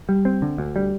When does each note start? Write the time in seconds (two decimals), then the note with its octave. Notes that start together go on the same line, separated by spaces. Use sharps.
0.09 G3
0.25 C4
0.42 D3
0.58 D2
0.76 G3